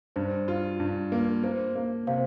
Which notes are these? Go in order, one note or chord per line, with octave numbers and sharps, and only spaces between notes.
G2 C5
F4
G2
A#3
A#3 C5
A#3
C3 C5 F5